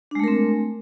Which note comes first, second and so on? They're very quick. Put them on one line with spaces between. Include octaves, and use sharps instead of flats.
D4 G#3 A3 A#4 C4